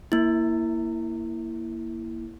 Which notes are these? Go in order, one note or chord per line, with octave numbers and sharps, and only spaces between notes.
A#3 E4